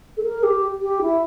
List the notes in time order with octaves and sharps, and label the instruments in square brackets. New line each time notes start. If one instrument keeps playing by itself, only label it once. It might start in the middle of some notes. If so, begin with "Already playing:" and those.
[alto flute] A4
A#4
G4
G4
E4